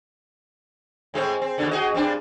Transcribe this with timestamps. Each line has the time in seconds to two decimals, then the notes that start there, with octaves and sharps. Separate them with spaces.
1.14 A2 G#3 C4
1.42 C4
1.58 D#2 B2 D3
1.71 F#4 G#4 D#5
1.94 G2 C4 D4